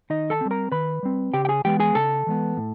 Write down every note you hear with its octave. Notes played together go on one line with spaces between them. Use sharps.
D#3 D#4 D#5
A4 A5
G3 C4
A#4 A#5
D#3 B4 B5
G3 C4
C#3 G4 G5
G5
G#4 G#5
E3 G#3 B3 G4 G5
G#4 G#5
C#3 A4 A5
E3 G#3 B3
A2